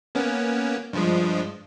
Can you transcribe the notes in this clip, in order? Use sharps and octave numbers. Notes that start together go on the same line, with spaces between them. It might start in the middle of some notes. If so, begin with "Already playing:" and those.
A#3 B3 C#4
G2 F3 G#3